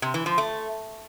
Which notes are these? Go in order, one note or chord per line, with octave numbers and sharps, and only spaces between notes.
C3
E3
F3
A3